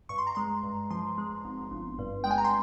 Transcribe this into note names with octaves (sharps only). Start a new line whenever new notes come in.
G2 C#6
C6
A#5
G#3 C6
G2
F3 C6
G#3
G#1
G1
G2
G#3 G5
G#5
A#5
C6